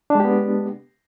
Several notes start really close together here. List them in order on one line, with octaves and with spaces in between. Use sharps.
D4 G#3 G4 B3